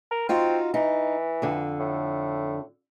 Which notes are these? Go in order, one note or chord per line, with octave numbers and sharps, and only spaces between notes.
A#4
C4 D#4 F4 F#4
E3 D#4
F2 D3
A2